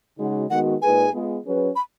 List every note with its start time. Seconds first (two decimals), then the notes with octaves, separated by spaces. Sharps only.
0.19 C#3 G#3 D#4 F#4
0.50 D#3 G#3 B3 F#4 F#5
0.82 A#2 G#3 D#4 G#4 B4 G#5
1.13 G#3 B3 F4 G#4
1.45 F#3 C#4 G#4 B4
1.76 B5